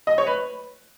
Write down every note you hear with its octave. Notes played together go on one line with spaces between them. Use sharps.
D#5
C#5
B4